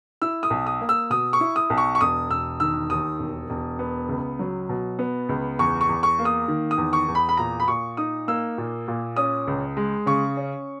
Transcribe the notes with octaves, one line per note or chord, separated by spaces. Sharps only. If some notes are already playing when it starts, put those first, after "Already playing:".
E4 E6
D#6
B1
D#6
A#3
E6
B2 D#6
C#6
E4
D#6
B1
C#6
C#6
E1 D#6
E1 E6
D#3 E6
D#2 D#6
E1
E1
B3
C#2
F#3
B2
B3
C#2
E2 C#6
C#6
E2
C#6
A#3
D#6
D#3
D#6
E2
C#6
E2
B5
B5
A#2 A#5
B5
A#2 C#6
D#4 D#6
A#3 E6
A#2
A#2
C#4 D#6
C#2
G#3
C#3 C#6
C#4